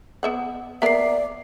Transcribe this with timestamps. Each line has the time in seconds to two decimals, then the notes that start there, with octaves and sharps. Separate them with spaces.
0.23 B3 E5 F#5
0.82 A#3 B3 A#4 D5 E5 C7